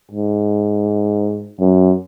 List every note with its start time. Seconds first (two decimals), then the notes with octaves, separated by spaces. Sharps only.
0.11 G#2
1.60 F#2